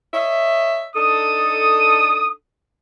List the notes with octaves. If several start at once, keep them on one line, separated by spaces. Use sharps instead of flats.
C#5 D#5 E5
D4 D#4 A4 D#6